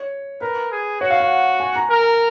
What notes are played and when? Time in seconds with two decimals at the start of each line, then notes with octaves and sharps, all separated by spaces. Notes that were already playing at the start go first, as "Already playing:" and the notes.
Already playing: C#5
0.41 A#4 B4
0.71 G#4
1.01 F#4 C#5
1.10 F5
1.20 F#5
1.60 G#5
1.76 A#5
1.90 A#4